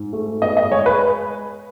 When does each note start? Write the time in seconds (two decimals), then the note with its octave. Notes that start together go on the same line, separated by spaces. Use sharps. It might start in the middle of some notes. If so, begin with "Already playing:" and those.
Already playing: G#2
0.13 A3
0.42 B3 D#5
0.57 D#5
0.71 G#3 C#5
0.86 B4